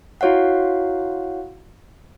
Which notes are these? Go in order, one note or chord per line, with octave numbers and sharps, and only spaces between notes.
E4 F#4 C#5 F5 F#5